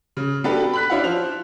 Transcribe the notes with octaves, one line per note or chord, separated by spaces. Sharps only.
C#3
B3 D4 F#4 G4 A4 B4
B5 F#6 B6
C#4 D4 E4 F5 F#5
F3 C5 F7